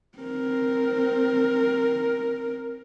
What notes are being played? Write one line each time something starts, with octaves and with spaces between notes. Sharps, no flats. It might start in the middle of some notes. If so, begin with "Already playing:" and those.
C4 A#4